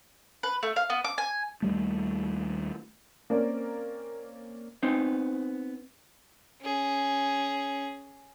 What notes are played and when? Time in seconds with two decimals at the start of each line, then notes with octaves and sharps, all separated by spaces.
0.43 B4
0.63 A3
0.76 F5
0.90 B3
1.05 D6
1.18 G#5
1.62 D#2 G3 A3
3.30 A#3 C4 C#4 A#4 D5
4.83 B3 C4 D#4
6.61 C#4 G#4